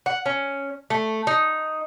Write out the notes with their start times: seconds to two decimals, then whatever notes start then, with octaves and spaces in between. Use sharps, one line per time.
0.06 F#5
0.26 C#4
0.90 A3
1.27 D#4